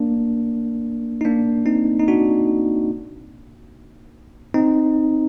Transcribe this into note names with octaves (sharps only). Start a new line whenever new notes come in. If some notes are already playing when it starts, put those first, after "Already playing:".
Already playing: A#3 D4
D#4
A#3 D4
C4 D#4
D#4
D4 F#4
C4 D#4